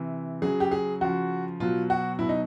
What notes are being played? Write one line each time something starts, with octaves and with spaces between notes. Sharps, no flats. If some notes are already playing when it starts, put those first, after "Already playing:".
Already playing: C3 E3
C#3 F#3 G#4
G4
G#4
C#3 F3 F#4
B2 F#3 F4
F#4
B2 F#3 E4
D#4